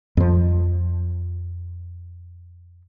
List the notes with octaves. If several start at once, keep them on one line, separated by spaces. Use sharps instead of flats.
F2 F3